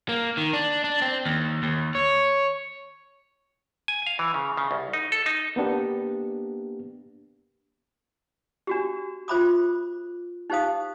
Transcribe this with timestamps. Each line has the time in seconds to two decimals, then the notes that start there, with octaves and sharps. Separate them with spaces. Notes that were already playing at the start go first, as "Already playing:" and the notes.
0.09 A#3
0.37 D#3
0.53 D4
0.84 D4
1.02 C4
1.26 D#2
1.63 D#2
1.95 C#5
3.88 G#5
4.07 F5
4.19 E3
4.34 C#3
4.57 C#3
4.71 C2
4.93 D#4
5.12 A4
5.26 D#4
5.56 A#3 B3 D4 G4
8.67 D4 F#4 G4
9.28 F4 C5 E5 B5 D6 D#6
10.50 D#4 G4 C5 F5 D#6